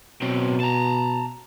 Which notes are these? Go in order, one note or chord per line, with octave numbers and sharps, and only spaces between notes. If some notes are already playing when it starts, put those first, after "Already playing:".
B2 F#3 C4
A5 A#5